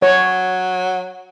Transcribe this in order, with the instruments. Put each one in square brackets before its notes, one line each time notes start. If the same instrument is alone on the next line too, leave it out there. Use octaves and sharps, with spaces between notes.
[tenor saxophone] F#3 [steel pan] C#5